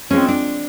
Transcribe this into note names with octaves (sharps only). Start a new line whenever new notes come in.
F3 G#3 C4 C#4
D4